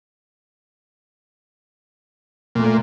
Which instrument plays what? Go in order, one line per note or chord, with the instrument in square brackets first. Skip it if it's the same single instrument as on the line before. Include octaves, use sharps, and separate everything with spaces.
[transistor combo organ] A#2 [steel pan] A3 A#3